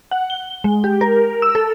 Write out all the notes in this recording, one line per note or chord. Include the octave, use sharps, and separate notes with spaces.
F#5
G7
G#3
G4
A#4
E6
A4